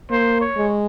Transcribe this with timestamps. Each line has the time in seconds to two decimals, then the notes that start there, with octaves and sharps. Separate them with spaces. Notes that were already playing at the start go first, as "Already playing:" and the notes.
0.11 A#3 C5
0.41 C#5
0.57 G#3